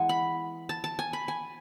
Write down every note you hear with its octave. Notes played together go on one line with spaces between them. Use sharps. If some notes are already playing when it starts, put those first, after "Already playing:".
Already playing: E3 G#3 B3 F#5 G#5
B5
A5
A5
G#5
B5
G#5